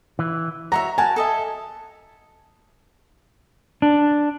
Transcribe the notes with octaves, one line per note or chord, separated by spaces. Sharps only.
E3
F#4 C#5 E5 A#5
F#4 A#4 G#5 A5
A4 D#5 E5
D4